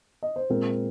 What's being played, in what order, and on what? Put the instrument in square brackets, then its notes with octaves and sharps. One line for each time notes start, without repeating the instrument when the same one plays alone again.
[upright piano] D#5
C5
A#2 G#3 C4 A#4